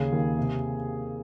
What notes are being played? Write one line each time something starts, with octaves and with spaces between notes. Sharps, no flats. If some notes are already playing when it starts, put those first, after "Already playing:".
Already playing: D#2 C#3 G#4
D#2
C3